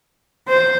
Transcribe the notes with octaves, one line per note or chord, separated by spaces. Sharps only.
C5